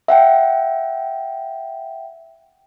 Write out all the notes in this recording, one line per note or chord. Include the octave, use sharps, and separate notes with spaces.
E5 F#5 G5